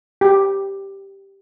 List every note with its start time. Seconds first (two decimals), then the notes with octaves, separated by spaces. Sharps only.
0.21 G4